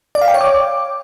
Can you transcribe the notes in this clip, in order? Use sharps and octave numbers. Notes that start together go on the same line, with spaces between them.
D5
F5
G5
C#5
D6